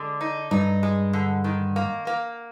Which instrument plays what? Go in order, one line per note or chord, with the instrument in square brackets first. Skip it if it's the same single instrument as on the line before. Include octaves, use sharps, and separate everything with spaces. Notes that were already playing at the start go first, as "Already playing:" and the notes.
Already playing: [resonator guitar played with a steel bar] D3 G#3
D#4
[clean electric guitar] G2 [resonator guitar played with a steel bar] D#4
[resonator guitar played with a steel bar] G#3
D3
D#3
A#3
A#3